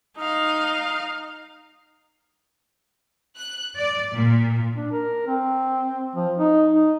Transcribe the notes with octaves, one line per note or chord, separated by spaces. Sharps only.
D#4 F5
F#6
D5
A#2
D4
A#4
C4
F3
D#4
D#4